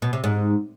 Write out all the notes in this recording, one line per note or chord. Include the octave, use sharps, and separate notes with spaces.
B2
C3
G#2